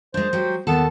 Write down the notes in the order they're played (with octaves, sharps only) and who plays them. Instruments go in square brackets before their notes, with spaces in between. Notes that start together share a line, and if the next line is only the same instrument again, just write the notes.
[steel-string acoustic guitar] G#3 D4 [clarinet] C5
[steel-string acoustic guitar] F#3 G#3 G4
[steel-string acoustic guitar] D#2 A4 A5 [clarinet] B3